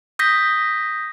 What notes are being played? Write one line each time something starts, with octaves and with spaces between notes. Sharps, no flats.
D#6 G6 A#6 B6